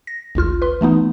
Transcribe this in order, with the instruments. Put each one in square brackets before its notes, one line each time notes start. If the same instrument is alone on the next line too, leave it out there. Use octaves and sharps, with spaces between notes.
[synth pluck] A#6
G#1 D2 F4 F6
B4 C6
E3 A3 B3 D#4